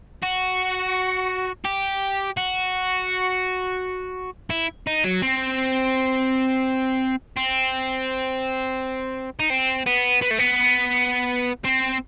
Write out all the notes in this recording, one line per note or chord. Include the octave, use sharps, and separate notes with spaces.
F#4
G4
F#4
E4
D#4
F#3
C4
C4
D#4
C4
B3
B3
A3
B3
C4